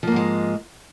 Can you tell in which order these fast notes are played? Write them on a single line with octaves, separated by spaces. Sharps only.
F3 A#3 G#2 G#3